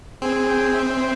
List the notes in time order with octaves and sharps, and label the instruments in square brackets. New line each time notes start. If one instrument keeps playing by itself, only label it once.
[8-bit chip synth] C4 [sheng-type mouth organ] G#4
[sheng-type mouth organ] G5
E5
C5